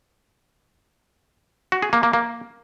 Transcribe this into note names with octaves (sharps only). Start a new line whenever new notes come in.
F#4
G#4
A#3
A#3
A#3